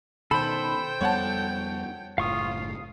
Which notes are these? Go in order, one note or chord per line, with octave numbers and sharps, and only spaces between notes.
B2 D#3 A4 C5 G5 B5
F2 G3 B3 C#5 F#5 A5
F#1 A2 F4 F5 C#6 D#6